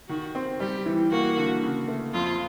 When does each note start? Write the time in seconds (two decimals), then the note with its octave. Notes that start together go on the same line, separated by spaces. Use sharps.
0.09 D#3 F#4
0.35 C4
0.60 G3 G4
0.86 E3
1.11 A#3 F#4
1.37 D3
1.63 C#3
1.88 A3
2.14 F2 F4